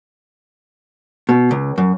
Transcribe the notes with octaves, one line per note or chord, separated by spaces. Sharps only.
B2
C#2
F#2